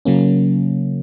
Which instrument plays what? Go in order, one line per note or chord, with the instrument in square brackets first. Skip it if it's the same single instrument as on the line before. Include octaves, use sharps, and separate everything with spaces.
[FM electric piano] C#3 F#3 A#3 C#4